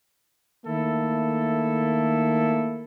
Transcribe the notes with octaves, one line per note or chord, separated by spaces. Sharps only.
D#3 A3 A#3 E4 A4